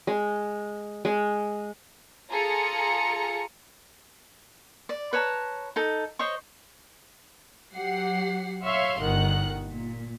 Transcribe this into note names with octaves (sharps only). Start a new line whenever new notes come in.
G#3
G#3
F4 G#4 A4 A#5 C#7
D5
B4 C#5 A5 A#5
D#4 A4
C5 C#5 D#5 C#6
F#3 G4 F#5 C7
C#5 E5 F5 C6 C#6
G1 D#3 F#5 F#6
A#2